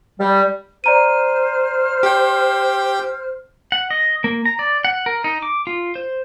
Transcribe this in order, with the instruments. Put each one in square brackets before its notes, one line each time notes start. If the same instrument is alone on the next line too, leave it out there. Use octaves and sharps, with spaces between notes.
[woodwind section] G3
[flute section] C5 F6 [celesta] D5 A#5 D#7
[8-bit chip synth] G4 G5
[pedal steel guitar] F#5
D#5
A#3
A#5
D5
F#5
A#4
D#4
D6
F4
C5